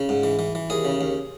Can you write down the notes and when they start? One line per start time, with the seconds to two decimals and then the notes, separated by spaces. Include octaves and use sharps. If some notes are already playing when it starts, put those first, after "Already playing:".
Already playing: C#3
0.09 G#2
0.23 E3
0.39 E3
0.55 E3
0.70 D#2 G#4
0.85 C#3
1.01 D#2